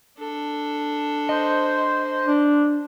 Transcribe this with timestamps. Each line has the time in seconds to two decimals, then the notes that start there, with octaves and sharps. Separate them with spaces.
0.18 D4 A4
1.29 C5 D#5
2.26 D4